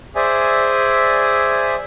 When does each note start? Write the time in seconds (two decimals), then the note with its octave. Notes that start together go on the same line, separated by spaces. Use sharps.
0.16 G#4 C5 D5 E5 G#5